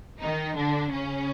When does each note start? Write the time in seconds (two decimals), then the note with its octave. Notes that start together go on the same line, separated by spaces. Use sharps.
0.20 D#3 D#4
0.56 D3 D4
0.92 C#3 C#4